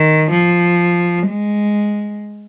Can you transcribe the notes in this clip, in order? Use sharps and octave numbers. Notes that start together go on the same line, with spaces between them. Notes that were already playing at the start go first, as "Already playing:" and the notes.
Already playing: D#3
F3
G#3